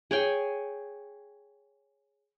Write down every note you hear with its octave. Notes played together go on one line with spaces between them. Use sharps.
G#4 C#5 G5 G#5